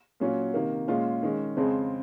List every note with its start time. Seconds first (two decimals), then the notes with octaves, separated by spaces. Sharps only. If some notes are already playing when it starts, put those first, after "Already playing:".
0.20 A#2 F#3 C#4 F4
0.54 C3 D#3 A#3
0.88 A#2 G#3 C#4 F4
1.23 D#3 G#3 C#4
1.57 F2 C#3 G#3 C4